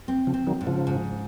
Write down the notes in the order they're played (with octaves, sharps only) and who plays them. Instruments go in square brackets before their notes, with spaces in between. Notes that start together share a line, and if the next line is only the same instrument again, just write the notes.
[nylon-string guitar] C4
[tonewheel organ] C#3 F3
[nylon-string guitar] C4
[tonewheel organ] D#3 F#3
[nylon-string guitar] G#2
[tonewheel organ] C#3 F3
[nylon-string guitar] G#2